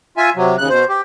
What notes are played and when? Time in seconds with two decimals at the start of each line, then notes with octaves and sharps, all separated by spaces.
0.17 F4 E5 G#5
0.36 C3 F#3
0.58 D#2 C#3 F#6
0.69 B2 C5
0.89 G4